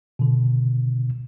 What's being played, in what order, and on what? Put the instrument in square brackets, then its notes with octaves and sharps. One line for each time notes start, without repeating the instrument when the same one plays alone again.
[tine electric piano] B2 D3